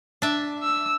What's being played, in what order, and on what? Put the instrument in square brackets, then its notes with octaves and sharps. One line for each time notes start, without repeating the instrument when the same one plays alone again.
[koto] D4 E5
[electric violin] E6